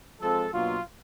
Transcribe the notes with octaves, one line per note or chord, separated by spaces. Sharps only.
F3 G#3 C4 A4
B2 F#3 A#3 D4 F4